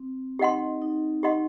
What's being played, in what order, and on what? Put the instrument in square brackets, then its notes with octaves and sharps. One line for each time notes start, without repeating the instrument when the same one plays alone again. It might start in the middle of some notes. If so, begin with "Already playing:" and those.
Already playing: [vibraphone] C4
[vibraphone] D#4 [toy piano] G4 D#5 F#5 C6
[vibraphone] D#4
[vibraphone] D#4 [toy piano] G4 D#5 F#5 C6